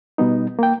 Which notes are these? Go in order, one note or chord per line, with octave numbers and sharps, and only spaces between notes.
B2 G3 B3 D#4
A#3 G5